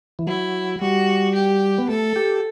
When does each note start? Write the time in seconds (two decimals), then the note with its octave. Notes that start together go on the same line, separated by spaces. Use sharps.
0.19 E3
0.27 F#3 E4
0.81 G3 F#4
1.35 G4
1.78 B3
1.89 A3 A4
2.16 G4